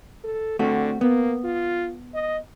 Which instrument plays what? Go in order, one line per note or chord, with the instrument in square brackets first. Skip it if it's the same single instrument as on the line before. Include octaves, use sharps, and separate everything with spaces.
[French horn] A4
[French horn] D3 [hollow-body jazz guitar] A3 C4 F#4
[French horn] A#3 [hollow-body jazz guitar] B3
[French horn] F4
D#5